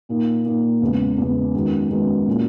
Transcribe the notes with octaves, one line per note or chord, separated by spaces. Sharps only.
A#2 A#3 D#4
A#2 A#3 D#4
E2 C#3 G#3
E2 C#3 G#3
F#2 D#3 G#3 B3
F#2 D#3 G#3 B3
A#2 F#3 C#4 E4